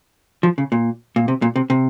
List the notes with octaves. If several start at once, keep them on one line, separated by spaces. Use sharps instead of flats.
F3
C#3
A#2
A#2
C3
A#2
C3
C3